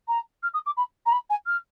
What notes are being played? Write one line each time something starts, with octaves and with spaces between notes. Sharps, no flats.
A#5
F6
D#6
D6
B5
A#5
B5
G#5
F6